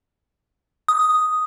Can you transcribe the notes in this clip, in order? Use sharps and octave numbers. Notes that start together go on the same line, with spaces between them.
D#6